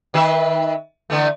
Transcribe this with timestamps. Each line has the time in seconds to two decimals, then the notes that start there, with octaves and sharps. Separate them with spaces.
0.14 D#3 B4 E5
1.10 D3 E3 A3